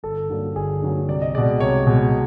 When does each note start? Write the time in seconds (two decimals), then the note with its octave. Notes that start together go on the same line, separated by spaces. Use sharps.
0.03 G1 A4
0.30 G2 D3 F#3 A#3
0.55 G1 G#4
0.82 G2 D3 F#3 A#3
1.08 C2 D5
1.22 D#5
1.35 B2 G#3 D5
1.60 C2 C#5
1.87 B2 G#3